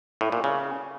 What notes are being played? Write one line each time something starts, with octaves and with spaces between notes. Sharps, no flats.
A2
A#2
C#3